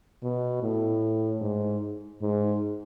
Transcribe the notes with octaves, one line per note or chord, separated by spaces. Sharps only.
B2
A2
G#2
G#2